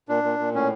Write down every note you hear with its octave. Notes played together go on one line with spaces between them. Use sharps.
A#2 D4
A#2
A#2
A2 C#4